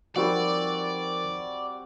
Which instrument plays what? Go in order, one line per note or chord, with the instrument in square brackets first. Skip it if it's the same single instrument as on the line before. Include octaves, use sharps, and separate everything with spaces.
[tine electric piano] F3 D#4 A#4 [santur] G3 C4 F#4 [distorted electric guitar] D5